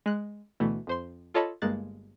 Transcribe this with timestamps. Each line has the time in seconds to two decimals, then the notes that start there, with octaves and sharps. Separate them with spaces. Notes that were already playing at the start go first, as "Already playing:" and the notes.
0.06 G#3 F#6
0.60 D2 B2 E3 A3
0.87 F2 C5 C6
1.34 F4 A4 C#5 D#5 A5 B5
1.62 G1 G2 G#3 A#3 F#6 A6